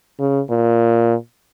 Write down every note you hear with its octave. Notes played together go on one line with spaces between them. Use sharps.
C#3
A#2